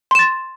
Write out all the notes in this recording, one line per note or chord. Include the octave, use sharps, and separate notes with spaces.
C6 A6 E7